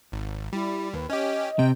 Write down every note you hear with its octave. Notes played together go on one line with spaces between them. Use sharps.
G#1
G3 E4
D#2 B4
C#4 G4 D#5
C3 G5